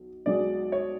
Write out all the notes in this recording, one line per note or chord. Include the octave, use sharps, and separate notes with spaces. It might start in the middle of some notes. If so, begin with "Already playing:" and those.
Already playing: B1
B1 B2 G#3 D5
C#5